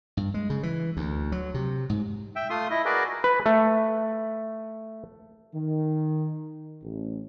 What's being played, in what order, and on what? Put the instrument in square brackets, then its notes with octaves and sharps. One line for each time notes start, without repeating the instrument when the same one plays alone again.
[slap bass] G2
G#3
C#3
E3
D2
F#3
C3
G#2
[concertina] E5 G5
A3 F4 C6 D#6
E4 D#5
F#4 G#4 A#4 B4 D5
[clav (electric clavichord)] B4
A3
[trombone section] D#3
A1